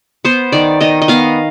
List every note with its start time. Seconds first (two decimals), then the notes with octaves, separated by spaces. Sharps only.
0.25 B3 C5
0.52 D#3 D5
0.81 D#3 D#5
1.02 D#5
1.08 B3 F5